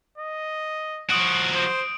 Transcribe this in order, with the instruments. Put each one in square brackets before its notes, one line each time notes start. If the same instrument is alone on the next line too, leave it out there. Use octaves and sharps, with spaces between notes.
[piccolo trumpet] D#5
[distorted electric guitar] F3 F#4 [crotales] D#6 D7
[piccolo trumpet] C5